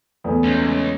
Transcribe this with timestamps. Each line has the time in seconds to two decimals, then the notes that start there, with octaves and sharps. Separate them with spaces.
0.24 E2 A3 B4
0.44 C#2